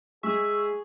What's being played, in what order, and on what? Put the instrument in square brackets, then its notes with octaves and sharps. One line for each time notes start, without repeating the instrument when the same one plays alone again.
[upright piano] G#3 [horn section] G#4 [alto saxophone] E5 [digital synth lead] C#6